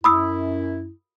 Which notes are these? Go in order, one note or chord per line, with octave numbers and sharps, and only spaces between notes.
F#2 E4 B5 D#6 E6